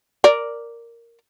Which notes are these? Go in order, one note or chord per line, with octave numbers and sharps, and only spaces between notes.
A#4 D5